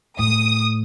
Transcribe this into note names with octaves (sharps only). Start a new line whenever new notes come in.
A2 D#6